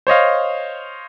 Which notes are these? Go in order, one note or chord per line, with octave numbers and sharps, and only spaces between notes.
C5 C#5 D#5 F5